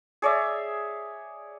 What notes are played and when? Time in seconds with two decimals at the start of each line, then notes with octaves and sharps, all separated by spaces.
0.22 G#4 C#5 D5 E5